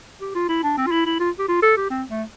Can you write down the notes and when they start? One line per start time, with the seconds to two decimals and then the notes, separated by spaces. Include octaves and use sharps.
0.21 G4
0.35 F4
0.49 E4
0.63 D4
0.77 C4
0.87 F4
0.92 E4
1.06 E4
1.20 F4
1.39 G4
1.48 F4
1.62 A4
1.77 G4
1.90 C4
2.10 A3